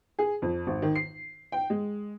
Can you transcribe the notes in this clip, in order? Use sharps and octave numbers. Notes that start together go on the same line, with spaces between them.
G#4
F2
G#1
D#3
C7
G5
G#3